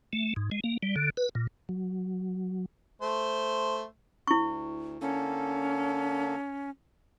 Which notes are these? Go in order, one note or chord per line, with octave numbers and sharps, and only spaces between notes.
A3
G#2
G#3
A#3
G3
D3
B4
A#2
F#3
A3 C5
D2 E4 C#6
D3 A#3 C#4 A4